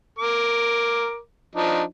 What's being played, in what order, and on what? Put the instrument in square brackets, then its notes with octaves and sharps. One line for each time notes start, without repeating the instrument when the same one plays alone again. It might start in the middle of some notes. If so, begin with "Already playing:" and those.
[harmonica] A#4 D6
F3 D4 D#4